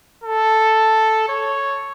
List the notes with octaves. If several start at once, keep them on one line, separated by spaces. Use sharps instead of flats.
A4
C#5